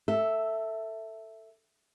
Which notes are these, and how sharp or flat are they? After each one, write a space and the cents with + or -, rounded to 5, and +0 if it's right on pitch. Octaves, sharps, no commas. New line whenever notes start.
A4 +15 E5 +0